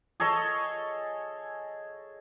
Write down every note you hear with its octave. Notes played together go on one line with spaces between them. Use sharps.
G#4 A4 C#5 D#5